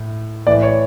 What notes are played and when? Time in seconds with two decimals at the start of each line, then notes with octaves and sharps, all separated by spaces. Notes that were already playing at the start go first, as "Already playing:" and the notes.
Already playing: A2
0.47 A2 E3 D5
0.63 C#5